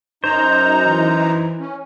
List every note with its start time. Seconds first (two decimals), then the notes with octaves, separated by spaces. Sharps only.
0.24 F#2 D#4 C5 A#5
0.86 E3
1.60 C#4